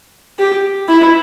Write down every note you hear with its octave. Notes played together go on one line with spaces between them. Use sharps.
G4
E4